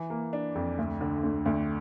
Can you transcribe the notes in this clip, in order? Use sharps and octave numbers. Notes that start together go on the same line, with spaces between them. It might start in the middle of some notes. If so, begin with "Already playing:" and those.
Already playing: E3
A#3
D4
F2
D2
D3
D2
D2